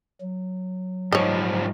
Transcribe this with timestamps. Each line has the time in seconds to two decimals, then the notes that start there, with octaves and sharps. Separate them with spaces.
0.21 F#3
1.12 G#2 F3 G3 C#5 D#5